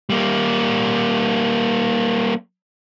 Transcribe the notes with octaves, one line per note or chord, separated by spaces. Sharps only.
G3 A#3